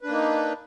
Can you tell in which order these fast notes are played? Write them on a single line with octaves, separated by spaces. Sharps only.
B4 D4 A#3 D#4